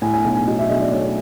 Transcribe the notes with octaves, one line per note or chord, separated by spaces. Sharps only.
A2 G#5
G#5
B1
G#5
F#3 D#5
E5
B1 D#5
D5
A3 C#5